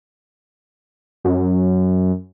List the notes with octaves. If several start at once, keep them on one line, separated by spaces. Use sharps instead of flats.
F#2